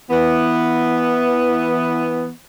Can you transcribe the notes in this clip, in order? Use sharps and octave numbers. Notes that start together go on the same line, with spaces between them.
E3 B3